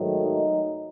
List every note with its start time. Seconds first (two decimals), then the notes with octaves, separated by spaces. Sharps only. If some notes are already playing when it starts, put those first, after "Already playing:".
Already playing: G#2 D#3 F#3 A3
0.25 D#4